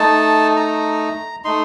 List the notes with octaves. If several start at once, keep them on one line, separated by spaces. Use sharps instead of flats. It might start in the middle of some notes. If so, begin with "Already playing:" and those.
Already playing: A3 D#4 A5
A#5
A3 D#4 C6